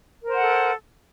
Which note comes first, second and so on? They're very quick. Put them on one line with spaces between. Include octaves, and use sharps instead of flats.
A#4 C5 F#5 A4